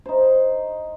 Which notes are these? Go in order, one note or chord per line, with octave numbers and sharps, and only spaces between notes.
D#4 C5